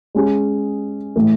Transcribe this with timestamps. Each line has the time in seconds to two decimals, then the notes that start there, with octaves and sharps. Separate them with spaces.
0.15 G#3 C#4 G#4
1.16 A2 E3 A3